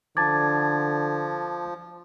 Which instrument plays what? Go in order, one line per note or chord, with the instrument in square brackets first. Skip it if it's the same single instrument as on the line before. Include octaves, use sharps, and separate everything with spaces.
[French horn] D3 [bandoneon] F3 [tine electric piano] A5 D6 [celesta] G#6 A6